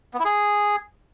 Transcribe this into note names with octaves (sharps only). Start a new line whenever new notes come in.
B3
E4
G#4